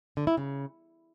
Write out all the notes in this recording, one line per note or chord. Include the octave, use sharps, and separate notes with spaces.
D3
E4
C#3